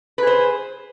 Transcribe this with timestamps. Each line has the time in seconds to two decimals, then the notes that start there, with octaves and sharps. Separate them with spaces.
0.18 B4
0.23 G#4
0.27 C5